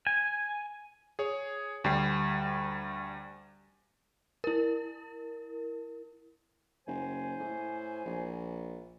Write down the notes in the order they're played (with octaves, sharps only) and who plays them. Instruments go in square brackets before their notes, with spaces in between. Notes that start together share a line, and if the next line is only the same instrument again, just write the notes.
[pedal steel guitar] G#5
[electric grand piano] G#4 C#5
D2 G3 G5 C7
[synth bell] E4 A#4
[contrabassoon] F#1 [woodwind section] C5 G#5
[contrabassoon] A2
A#1